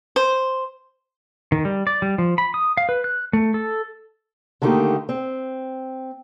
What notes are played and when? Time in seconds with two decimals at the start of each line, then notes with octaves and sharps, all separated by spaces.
0.16 C5
1.52 D#3
1.65 G3
1.87 D5
2.02 G3
2.18 F3
2.38 B5
2.54 D#6
2.77 F5
2.89 B4
3.04 F#6
3.33 A3
3.54 A4
4.62 D3 D#3 A3 A#3 D#4 G4
5.09 C4